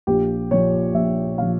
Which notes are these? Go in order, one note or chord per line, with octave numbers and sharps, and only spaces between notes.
A#1 G4
A#2 F3 C#5
A#1 E5
A#2 F3 F5